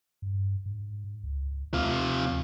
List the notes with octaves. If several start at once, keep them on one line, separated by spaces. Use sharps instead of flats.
G2
G#2
C#2
D#2 C3 F4